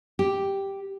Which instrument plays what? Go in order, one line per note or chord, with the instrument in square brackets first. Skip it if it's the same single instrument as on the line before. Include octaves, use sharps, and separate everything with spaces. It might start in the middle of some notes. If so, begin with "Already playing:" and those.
[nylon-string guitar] G4